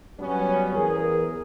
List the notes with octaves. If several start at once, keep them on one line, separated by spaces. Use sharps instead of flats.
F#3 G3 B3 C#4
E2 G#4 A#4